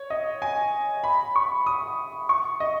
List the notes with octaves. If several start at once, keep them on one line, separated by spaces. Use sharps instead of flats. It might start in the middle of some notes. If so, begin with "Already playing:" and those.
Already playing: C#5
D#5
G#5
B5
C#6
D#6
C#6
D#5